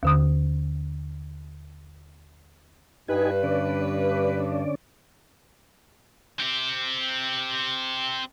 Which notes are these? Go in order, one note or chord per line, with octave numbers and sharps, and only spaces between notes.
D#2 D3 D#6
G2 D#4 G4 B4 G#5
D3 C#4 D5
C4 G4